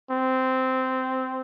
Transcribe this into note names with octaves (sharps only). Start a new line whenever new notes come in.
C4